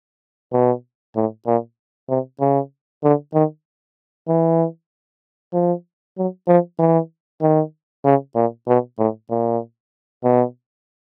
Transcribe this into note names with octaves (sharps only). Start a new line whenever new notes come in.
B2
A2
A#2
C3
C#3
D3
D#3
E3
F3
F#3
F3
E3
D#3
C#3
A#2
B2
A2
A#2
B2